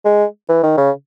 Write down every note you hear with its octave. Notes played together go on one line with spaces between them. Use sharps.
G#3
E3
D#3
C#3